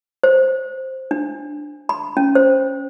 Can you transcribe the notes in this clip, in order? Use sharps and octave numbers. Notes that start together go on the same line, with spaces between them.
C5
D4
B5
C#4
C5